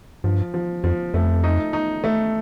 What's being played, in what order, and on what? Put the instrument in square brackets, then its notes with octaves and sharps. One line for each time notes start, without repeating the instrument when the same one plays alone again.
[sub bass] G2 [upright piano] F3
[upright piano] F3
[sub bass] F2 [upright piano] F3
[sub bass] F2 [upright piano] A3
[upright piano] D#4
D#4
A3